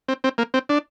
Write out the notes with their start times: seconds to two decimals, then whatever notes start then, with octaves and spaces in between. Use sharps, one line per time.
0.08 C4
0.24 C4
0.38 A#3
0.54 C4
0.69 D4